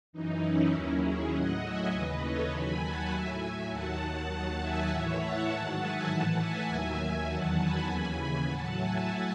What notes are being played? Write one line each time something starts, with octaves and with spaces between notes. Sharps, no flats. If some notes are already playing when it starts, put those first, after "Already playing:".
F#2 E3 D#4
C#4 E4
D#2 D#3 F#3 C#4 E4
E4 G#4
A2 F#3 D#5 F#5
E5 G#5
D#2 C#3 E3 B4 D#5
A4 C#5
D#2 D#3 F#3 G#5 B5
F#5 A5
A2 F#3 E5 G#5
D#2 D#3 F#3 F#5 A5
F#5 A5
D#2 D#3 F#3 F#5 A5
E5 G#5
A2 E3 C#5 E5
F#5 A5
G#2 D#3 F#3
E5 G#5
A2 E3 F#5 A5
E5 G#5
D#2 D#3 F#3
E2 D#3 F#3 F#5 A5
G#5 B5
D#2 C#3 E3
A2 F#3 F#5 A5
E5 G#5